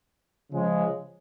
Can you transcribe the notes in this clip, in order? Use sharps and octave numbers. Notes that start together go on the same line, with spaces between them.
C#3 F3 G#3